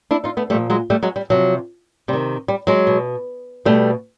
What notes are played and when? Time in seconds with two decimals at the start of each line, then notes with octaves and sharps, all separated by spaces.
0.11 D4 E4
0.24 D#4 F4
0.37 A3 B3
0.50 A#2 F3 G3 A3
0.70 F#3 G#3
0.90 G3 A3
1.03 F#3 G#3
1.16 G3
1.30 C3 F3 F#3
2.08 C3 G3
2.13 D#3
2.48 G3
2.67 F#3 G#3
2.87 B2
3.65 B2 G3 A3